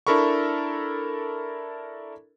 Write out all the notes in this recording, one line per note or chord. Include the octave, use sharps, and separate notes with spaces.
D4 E4 A4 A#4 B5 C#6